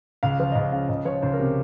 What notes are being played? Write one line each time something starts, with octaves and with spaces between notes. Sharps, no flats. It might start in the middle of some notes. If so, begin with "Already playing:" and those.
C#2 F5
F3
D#5
C#2 F5
C#3 F5
C#2 D#5
F3 C#5
C#2 C5
A#4
C3